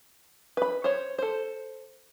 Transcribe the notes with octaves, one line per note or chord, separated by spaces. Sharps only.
B4 B5
C5 C#5
A4 C5